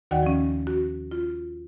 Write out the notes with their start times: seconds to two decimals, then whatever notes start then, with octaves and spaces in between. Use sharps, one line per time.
0.11 D#2 D#3 F#4 D5 F#5 G5
0.23 F3 C#4
0.67 F#4
1.11 F4